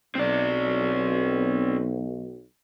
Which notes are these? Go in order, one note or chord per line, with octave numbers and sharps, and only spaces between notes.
B1 C4 D5